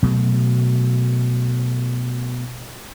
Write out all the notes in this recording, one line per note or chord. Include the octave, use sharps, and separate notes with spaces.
B2 F#3 A3